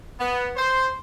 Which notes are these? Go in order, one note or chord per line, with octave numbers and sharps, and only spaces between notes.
B3
C5